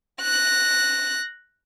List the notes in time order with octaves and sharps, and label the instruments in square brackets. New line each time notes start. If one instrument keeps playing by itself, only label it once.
[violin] F#6 A#6